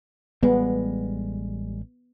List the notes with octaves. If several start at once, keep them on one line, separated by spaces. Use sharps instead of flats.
A1 G3 G#3 B3